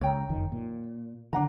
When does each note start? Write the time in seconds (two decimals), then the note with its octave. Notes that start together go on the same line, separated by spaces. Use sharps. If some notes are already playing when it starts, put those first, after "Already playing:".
0.01 C#2 C#5 G5 A#5
0.29 F#1 F2 D#3
0.52 A#2
1.33 D3 D#3 D4 F#5 A#5